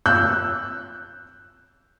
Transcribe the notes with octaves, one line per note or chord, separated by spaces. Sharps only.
E6 F#6 G6